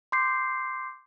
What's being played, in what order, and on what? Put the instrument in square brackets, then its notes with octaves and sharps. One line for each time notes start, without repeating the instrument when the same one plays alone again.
[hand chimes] C6 D6 G6 C7